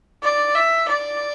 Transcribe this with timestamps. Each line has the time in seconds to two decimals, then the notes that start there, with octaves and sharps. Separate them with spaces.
0.23 D5
0.55 E5
0.89 D5